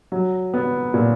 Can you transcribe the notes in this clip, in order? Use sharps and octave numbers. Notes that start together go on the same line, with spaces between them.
F#3
B3
A#2